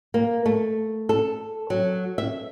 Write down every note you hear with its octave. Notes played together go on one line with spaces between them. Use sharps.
A#3
A3
A4
F#3
E5